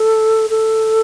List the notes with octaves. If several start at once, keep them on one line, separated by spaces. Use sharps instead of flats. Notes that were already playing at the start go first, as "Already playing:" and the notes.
Already playing: A4
A4